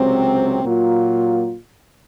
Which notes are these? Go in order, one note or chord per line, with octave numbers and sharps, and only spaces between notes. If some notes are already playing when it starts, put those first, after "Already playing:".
Already playing: C#2 C3 F#3 C4
A#2 F#3 A#3 F4